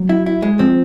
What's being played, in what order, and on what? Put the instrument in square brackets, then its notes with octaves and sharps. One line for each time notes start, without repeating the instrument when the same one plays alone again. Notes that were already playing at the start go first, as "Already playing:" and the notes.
Already playing: [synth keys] F#3
[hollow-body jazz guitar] E4
E4
G#3
[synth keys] F3 [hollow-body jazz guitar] C4